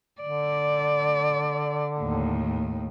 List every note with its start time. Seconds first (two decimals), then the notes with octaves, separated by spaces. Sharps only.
0.21 D3 D5
1.99 D#2 A2